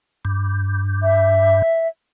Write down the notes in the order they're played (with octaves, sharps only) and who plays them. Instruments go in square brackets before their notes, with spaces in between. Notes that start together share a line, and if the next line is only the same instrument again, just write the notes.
[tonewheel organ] G2
[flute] E5